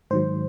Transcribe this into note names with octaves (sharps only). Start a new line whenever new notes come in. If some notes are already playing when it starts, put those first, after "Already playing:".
G#2 D#3 F#3 C5